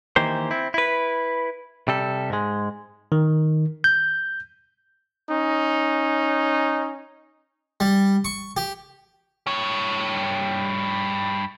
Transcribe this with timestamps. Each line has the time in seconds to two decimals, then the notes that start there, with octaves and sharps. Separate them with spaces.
0.16 D#3 E3 A#3 G4 C5
0.51 C4 E4
0.74 E4 B4
1.88 C3 G3 A4
2.30 G#2 G#3
3.12 D#3
3.84 G6
5.29 C#4 D#4
7.80 G3
8.25 C#6
8.57 G4
9.47 G2 C#5